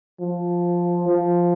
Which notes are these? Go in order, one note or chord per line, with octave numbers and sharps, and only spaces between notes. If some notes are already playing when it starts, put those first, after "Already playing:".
F3
F3